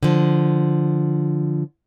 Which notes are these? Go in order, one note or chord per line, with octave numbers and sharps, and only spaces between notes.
D3 F3